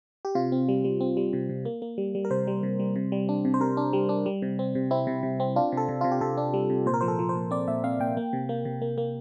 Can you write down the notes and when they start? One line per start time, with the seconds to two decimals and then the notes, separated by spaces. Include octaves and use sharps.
0.25 G4
0.35 C3 F4
0.52 C4
0.69 G3
0.84 G3
1.01 C4
1.17 G3
1.33 C3
1.49 C3
1.65 A#3
1.82 A#3
1.98 G3
2.15 G3
2.25 A#4
2.30 C3 C5
2.47 G3
2.63 C3
2.79 G3
2.96 C3
3.12 G3
3.29 D4
3.45 C3
3.54 C5
3.60 C3 A#4
3.77 D4
3.93 G3
4.09 D4
4.26 G3
4.42 C3
4.59 C4
4.75 C3
4.91 C4 E4
5.07 C3
5.23 C3
5.40 C4
5.56 D4 F4
5.72 C3
5.77 A4
5.89 C3
6.01 C3 F4
6.12 G4
6.21 C3 A4
6.37 D4
6.54 G3
6.70 C3
6.86 A#2 C5
6.94 A#4
7.01 F3 C5
7.08 A4
7.19 F3
7.29 C5
7.35 A#2
7.51 C4 D5
7.68 A#2 E5
7.84 C4 F5
8.00 A#2 G5
8.17 A#3
8.33 C3
8.49 A#3
8.65 C3
8.82 A#3
8.98 A#3